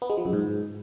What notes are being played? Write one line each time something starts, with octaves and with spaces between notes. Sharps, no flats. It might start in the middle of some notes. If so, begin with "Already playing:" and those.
B3
G#3
F3
F#2
G#2